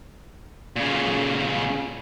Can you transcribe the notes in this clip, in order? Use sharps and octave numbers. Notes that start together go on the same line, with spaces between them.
A#2 C#3